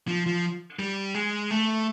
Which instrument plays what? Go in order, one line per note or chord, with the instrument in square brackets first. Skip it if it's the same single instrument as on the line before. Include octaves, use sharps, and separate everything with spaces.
[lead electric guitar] F3
F3
G3
G#3
A3